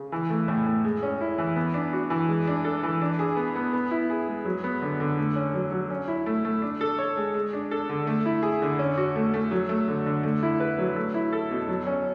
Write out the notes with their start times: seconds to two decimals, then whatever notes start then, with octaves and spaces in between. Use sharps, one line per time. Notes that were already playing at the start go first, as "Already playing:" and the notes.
Already playing: C#3
0.12 E3
0.30 A3
0.48 A2
0.66 A2
0.85 G#3
1.03 C#4
1.21 E4
1.38 E3
1.56 B3
1.74 D4
1.93 F#4
2.10 E3
2.29 G#3
2.47 D4
2.64 A4
2.83 E3
3.01 D4
3.19 G#4
3.36 B3
3.55 B3
3.73 B3
3.91 E4
4.10 G#4
4.28 G#3
4.45 F#3
4.64 B3
4.82 D3
5.00 D3
5.18 A3
5.36 C#4
5.54 F#3
5.71 F#3
5.90 C#4
6.08 E4
6.26 A3
6.45 A3
6.62 D4
6.81 A4
6.98 C#5
7.17 G#3
7.34 G#3
7.53 D4
7.71 A4
7.89 D3
8.07 A3
8.25 E4
8.43 G#4
8.62 D3
8.79 C#4
8.97 F#4
9.16 A3
9.34 A3
9.51 F#3
9.69 A3
9.88 D3
10.06 D3
10.23 A3
10.43 E4
10.60 B4
10.79 F#3
10.96 A3
11.14 E4
11.33 A4
11.51 B2
11.68 F#3
11.87 C#4